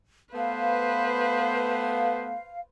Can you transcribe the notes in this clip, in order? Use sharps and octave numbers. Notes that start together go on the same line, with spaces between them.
A3 B3 B4 C5 F5